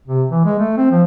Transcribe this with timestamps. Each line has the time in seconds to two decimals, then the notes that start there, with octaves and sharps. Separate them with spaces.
0.08 C3
0.30 E3
0.45 G#3
0.59 A3
0.77 C4
0.91 F3